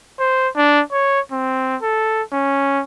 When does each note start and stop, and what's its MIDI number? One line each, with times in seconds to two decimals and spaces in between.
0.20 0.48 72
0.56 0.82 62
0.92 1.20 73
1.32 1.76 60
1.82 2.23 69
2.33 2.83 61